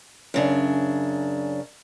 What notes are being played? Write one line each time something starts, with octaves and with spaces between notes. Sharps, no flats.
F#2 C#3 D4